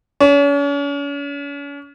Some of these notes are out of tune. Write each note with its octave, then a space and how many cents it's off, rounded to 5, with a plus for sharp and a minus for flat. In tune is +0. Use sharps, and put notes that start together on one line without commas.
C#4 +40